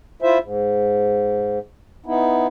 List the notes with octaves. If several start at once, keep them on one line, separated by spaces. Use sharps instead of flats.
E4 F4 C5 E5
G#2
B3 D#4 E4